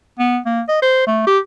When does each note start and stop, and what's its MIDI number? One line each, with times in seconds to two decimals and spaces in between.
0.19 0.38 59
0.46 0.62 58
0.69 0.81 75
0.82 1.07 72
1.07 1.26 57
1.27 1.39 67